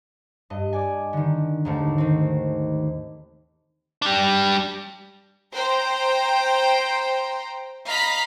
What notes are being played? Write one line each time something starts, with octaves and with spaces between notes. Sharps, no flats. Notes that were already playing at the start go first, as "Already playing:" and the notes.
G2 D#5
D5 G#5
D3 D#3
D#2 G#2 A3
D#3 C4
G3 D4
C5 G5 A#5
D#5 F5 A#5 B5 B6